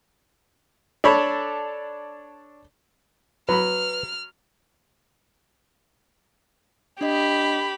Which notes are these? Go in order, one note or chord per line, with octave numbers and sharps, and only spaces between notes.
D4 A4 C#5 B5
F#3 B4 B5 F6
D4 G4 D#5 B5